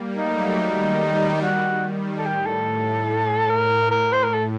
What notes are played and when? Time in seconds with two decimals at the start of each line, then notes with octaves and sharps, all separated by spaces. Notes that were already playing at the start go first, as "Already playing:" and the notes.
Already playing: G3 A#3
0.17 F#3 A3 D#4
0.59 D#3 G3
1.00 D#3 G3
1.42 F#4
1.84 D#3 G3
2.18 A4
2.25 A2 G4
2.46 A4
3.50 A#4
3.91 A#4
4.13 C5
4.23 A#4
4.34 A4